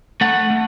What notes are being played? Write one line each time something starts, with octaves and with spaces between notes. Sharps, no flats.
A3 F#5
A3